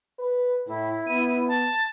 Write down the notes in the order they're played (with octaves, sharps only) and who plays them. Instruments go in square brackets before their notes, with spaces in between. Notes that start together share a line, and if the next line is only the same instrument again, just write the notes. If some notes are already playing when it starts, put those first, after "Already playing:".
[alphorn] B4
[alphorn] A2 [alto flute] E4
[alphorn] B3 [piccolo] D#7
[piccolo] A5